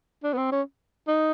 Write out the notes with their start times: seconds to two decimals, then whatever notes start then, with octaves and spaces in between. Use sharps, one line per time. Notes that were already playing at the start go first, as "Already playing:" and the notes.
0.24 D4
0.33 B3
0.38 C4
0.52 C#4
1.08 D#4